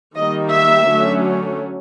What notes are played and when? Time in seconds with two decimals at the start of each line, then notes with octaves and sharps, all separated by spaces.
0.14 D#3 G3 A#3 D#5
0.50 E5
0.86 D3 F#3 A3 C#4